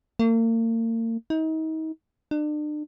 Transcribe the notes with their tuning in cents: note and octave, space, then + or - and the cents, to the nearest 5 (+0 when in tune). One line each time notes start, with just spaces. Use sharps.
A#3 -40
D#4 +35
D4 +40